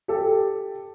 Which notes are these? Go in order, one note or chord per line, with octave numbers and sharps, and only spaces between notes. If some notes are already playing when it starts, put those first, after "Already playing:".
G4 A4